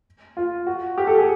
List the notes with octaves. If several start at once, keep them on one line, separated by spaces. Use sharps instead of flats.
F4
F#4
G4
A4
G#4